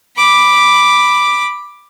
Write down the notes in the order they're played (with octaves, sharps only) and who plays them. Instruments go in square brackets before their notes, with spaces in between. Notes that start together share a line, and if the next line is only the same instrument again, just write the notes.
[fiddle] B5 D6